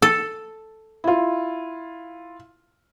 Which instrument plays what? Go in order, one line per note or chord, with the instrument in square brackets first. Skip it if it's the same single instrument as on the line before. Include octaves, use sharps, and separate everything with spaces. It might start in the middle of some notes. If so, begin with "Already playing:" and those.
[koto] A4
[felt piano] E4 F4